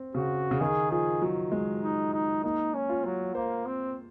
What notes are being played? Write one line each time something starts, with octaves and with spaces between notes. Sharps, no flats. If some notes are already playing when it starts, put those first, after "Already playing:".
Already playing: C4
C#3 F#4
C#3
D#3 G#4
F3 G#4
F#3
G#3
D#4
D#4
A#3 D#4
C#4
F4
F#3
A#3 C5
C4